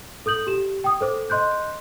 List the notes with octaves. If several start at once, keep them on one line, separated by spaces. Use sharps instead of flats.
A4 D#6 G6 F#7
G4 E7
G5 D#6
A4 C5 D6
D#5 C6 F#6 G6